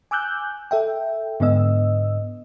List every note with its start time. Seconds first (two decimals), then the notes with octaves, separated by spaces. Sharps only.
0.11 G#5 D6 E6 F#6 G6
0.71 A4 E5 G5
1.40 G#2 D3 B3 D#5 E6